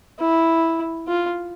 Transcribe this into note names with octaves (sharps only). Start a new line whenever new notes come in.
E4
F4